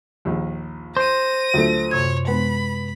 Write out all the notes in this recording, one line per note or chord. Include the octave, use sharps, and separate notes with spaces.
A#1 D#2
C5 A#6 D#7
D2 F#3 A3 F4
F#2 C3 C#5 G#6
G#3 B3 B5